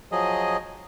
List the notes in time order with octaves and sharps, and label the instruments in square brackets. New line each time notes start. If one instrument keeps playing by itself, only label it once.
[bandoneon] F3 F#3 G#4 D#5